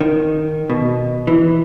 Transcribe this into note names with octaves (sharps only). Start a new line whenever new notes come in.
D#3
B2
E3